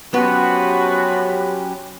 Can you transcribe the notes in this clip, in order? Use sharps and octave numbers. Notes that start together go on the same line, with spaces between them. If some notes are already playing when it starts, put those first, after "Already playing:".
F3 F#3 B3 C#4 F#4 G4 B4